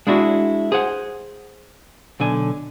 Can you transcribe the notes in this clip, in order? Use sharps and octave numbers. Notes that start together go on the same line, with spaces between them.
G#3 D4 E4 F#4
G#4 C5 F#5
B1 D3 G#5